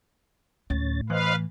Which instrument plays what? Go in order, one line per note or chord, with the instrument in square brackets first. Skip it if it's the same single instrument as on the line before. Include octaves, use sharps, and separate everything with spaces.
[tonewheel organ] D2 C#4 A6 [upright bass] A2
[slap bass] E3 [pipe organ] B4 F5 [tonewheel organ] C5 D#5 F#6